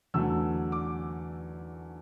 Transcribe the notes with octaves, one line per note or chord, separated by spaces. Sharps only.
E2 D3 F#3 A3 E6
D6